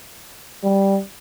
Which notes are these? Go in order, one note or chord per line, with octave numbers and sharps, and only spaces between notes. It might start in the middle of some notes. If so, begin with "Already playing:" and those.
G3